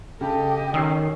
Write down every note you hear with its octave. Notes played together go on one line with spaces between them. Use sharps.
C#3 G4 A4 D#5
D#3 C#4 D#6 E6 C7